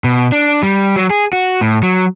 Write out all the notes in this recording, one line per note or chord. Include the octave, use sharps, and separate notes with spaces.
B2
D4
G3
F#3
G#4
F#4
A2
F#3